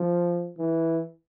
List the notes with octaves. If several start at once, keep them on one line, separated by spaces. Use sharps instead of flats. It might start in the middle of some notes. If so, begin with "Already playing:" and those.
Already playing: F3
E3